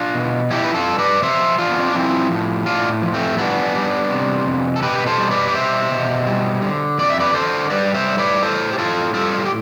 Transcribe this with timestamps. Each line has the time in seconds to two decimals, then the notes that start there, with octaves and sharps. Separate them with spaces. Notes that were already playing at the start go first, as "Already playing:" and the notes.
Already playing: D4 F4
0.15 B2
0.50 F3 E4 G4
0.64 B4
0.74 F4 A4
0.86 G2
0.98 B4 D5
1.22 F3 C5 E5
1.58 F3 D4 F4
1.71 B3
1.79 C4
1.87 D4
1.95 F3 C4 E4
2.31 A2
2.66 A2 D4 F4
3.02 F3
3.14 A3 C4
3.38 G3 B3 D4
3.74 G3
4.10 C3
4.46 F2
4.76 A4
4.82 B2 G4 B4
4.98 B4
5.06 A4 C5
5.18 G3
5.31 B4 D5
5.48 D5
5.55 B2 C5 E5
5.91 B2
6.27 G3
6.62 D3
6.98 F2 D5
7.10 E5
7.20 B4 D5
7.34 D3 A4 C5
7.70 G3 B4 D5
7.94 C5 E5
8.06 A2
8.18 B4 D5
8.42 A2 A4 C5
8.73 G4
8.78 A2 F4 A4
9.14 G3 F4 A4
9.45 G4